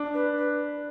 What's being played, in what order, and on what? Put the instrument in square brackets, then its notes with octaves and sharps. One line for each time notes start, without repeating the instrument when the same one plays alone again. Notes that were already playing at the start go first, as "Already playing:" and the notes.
Already playing: [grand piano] D4
[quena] B4
B4